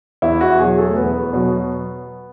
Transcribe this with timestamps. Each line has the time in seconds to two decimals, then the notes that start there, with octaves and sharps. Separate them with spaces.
0.22 E2 E4
0.41 F#4
0.59 B2 F#3 G#4
0.78 A4
0.89 A3
0.96 E2 B3
1.33 B2 F#3